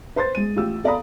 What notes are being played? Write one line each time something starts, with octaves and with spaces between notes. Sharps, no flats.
B4 C5 C6 A6
G#3 D#7
A1 F4 G4 E6
A4 D5 F5 A#5 B5 D#6